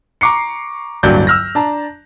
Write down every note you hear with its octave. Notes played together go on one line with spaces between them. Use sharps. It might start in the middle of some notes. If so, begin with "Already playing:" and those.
A#5 C#6 D6 C7 C#7
D1 G2 F#3 A#3 D5 G6
E6 F6 A#6
D4 A5 A#5